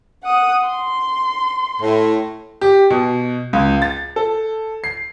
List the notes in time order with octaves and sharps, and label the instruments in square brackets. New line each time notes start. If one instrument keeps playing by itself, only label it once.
[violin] F#5 D#6
C6
[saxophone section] A2
[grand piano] G4
B2
C#2
A6
A4
C7